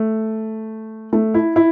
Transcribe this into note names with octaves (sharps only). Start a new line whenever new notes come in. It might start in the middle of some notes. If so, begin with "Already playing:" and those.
Already playing: A3
A3
E4
E4